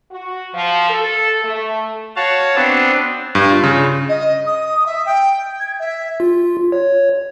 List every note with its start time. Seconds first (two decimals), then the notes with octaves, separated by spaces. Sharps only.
0.12 F#4
0.54 F3
0.90 A4
1.45 A3
2.16 F#4 C#5 F5 A5
2.55 B3 C4 D4
3.35 G2
3.51 F4
3.64 C#3
4.09 D#5
4.46 D#6
4.86 E5
5.06 G5
5.60 G#6
5.79 E5
6.20 F4
6.72 C#5